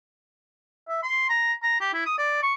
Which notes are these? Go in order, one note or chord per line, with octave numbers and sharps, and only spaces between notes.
E5
C6
A#5
A#5
G4
E4
D#6
D5
C#6